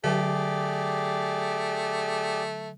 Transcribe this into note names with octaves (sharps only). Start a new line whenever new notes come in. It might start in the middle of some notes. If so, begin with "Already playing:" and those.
D3 F#3 A3 G4 G#4 D5